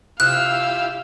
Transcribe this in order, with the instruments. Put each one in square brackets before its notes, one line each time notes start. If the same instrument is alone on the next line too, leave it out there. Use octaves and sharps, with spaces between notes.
[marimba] C3 D#6 [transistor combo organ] E4 F4 G4 [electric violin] F5 E6 [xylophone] F#6